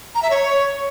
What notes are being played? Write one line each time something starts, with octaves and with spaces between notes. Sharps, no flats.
A#5
E5
C#5